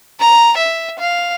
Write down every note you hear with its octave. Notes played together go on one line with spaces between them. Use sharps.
A#5
E5
F5